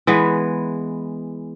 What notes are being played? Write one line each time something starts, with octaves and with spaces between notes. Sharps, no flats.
E3 G#3 B3